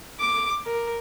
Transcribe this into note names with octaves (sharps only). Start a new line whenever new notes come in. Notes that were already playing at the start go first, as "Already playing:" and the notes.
D6
A#4